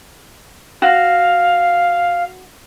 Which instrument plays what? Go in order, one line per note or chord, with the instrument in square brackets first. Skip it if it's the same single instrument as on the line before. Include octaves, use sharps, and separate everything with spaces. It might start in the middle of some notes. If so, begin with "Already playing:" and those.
[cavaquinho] F#4 [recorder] F5